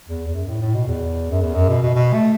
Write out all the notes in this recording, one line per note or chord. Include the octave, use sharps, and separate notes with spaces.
E2
E2
F#2
A2
A2
B2
E2
F#2
E2
F#2
B2
B2
B2
A3